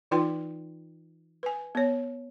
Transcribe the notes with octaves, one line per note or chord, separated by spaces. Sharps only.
E3 D#4 F4 B4 G5 C6
B4 G#5
B3 C#5